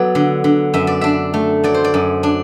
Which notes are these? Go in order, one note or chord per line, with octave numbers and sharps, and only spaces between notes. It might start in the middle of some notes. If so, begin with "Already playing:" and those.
Already playing: F#3 B3 A4 D5
D3
D3
F#2 E5
D5
D4 E5
A3
F#3 D5
C5
D5
F#2
D4